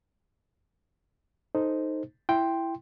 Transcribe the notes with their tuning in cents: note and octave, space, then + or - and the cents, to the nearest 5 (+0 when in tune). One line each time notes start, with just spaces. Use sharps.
D#4 +0 A4 +0 C5 +0
E4 +10 G5 +0 C6 +0